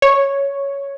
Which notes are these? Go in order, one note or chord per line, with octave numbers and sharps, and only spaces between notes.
C#5